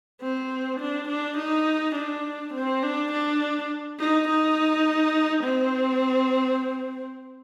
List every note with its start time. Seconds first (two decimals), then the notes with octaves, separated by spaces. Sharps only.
0.21 C4
0.80 D4
1.09 D4
1.38 D#4
1.96 D4
2.54 C4
2.83 D4
3.12 D4
3.99 D#4
4.28 D#4
5.44 C4